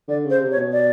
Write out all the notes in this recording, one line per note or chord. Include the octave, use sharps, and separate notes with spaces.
D3 D5
C#3
C5
C3
C#5
B2
D5